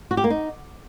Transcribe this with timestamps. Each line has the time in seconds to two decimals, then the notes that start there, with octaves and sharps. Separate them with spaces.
0.11 F#4
0.17 G4
0.24 A#3
0.30 D#4